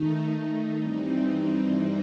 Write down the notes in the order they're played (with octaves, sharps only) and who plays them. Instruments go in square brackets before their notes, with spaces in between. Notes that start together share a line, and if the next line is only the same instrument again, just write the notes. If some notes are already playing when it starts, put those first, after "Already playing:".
Already playing: [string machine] D#3 A3 D#4
G2 E3 G3 C4 D#4